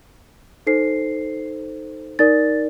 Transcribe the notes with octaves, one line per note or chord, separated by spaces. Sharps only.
D#4 A4 C5 C7
D#4 A#4 D5 A6